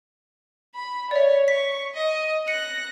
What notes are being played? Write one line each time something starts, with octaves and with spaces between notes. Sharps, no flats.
B5
C#5 D5 E5
C#6 B6
D#5
F#6 A#6 C#7